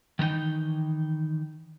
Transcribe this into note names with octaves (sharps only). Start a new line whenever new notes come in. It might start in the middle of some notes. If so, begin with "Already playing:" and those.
D#3 E3 A#3 D#4 G5